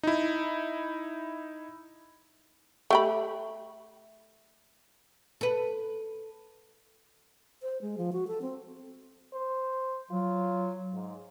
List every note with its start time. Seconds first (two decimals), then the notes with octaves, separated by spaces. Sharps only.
0.03 D#4 E4
2.90 A3 G4 B5
5.41 A4 B4
7.63 C5
7.82 G#3
7.98 F3
8.13 F#4
8.28 A4
8.42 C4
9.34 C5
10.11 F#3 F4
10.93 G#2